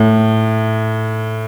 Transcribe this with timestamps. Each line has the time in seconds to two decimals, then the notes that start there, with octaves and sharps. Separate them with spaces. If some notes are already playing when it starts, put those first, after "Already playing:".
Already playing: A2